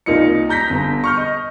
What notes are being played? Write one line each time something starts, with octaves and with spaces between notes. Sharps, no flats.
C2 A#3 D#4 F4 D#5 C#7
A#5 G6 A#6 B6
G1
C#6 F6 G6
D#5